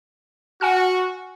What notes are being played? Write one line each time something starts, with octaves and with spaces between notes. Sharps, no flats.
F#4 F#5 G#5 F6